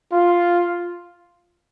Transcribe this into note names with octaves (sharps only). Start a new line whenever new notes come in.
F4